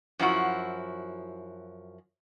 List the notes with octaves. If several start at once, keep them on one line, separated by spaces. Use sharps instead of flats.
F#2 F3 E4 F#4